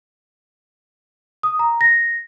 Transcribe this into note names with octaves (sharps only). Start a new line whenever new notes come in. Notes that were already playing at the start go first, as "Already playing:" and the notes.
D#6
A#5
A#6